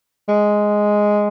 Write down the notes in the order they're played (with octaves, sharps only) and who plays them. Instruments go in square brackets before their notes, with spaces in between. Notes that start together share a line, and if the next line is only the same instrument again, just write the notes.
[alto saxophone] G#3